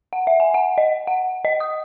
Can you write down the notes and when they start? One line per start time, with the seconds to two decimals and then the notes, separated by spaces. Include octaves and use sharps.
0.13 F#5
0.27 E5
0.40 G#5
0.54 F#5
0.78 D#5
1.07 F#5
1.45 D#5
1.60 D#6